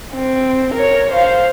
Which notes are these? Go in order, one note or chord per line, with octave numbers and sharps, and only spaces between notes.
C4
A#4 C#5
C5 F5